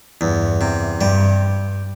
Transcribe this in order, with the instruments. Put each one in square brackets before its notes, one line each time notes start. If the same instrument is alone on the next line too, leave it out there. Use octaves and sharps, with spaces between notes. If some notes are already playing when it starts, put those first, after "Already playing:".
[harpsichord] E2 [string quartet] G2
[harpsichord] C3
[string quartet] G2 [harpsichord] G3